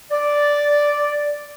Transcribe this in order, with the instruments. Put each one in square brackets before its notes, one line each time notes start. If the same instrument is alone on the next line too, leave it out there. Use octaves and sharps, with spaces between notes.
[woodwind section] D5